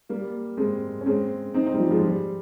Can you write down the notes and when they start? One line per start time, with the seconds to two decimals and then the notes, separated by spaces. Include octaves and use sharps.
0.09 G3 A#3
0.57 G#3 C4
1.01 C#4
1.06 G#3 C4
1.54 C4 D#4
1.66 C4 D#4
1.74 G3
1.78 F3
1.90 F3 G#3
2.03 G3